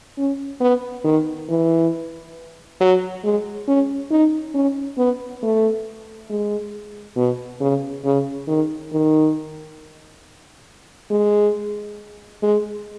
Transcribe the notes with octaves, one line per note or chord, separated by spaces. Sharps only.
C#4
B3
D#3
E3
F#3
G#3
C#4
D#4
C#4
B3
A3
G#3
B2
C#3
C#3
D#3
D#3
G#3
G#3